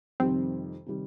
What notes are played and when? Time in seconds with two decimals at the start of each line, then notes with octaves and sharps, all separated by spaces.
0.20 F2 C3 D#3 G3 C4
0.86 C3 D#3 G3